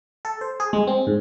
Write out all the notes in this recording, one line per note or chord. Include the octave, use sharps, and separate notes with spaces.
A4
C5
G#4
G#3
C4
G#2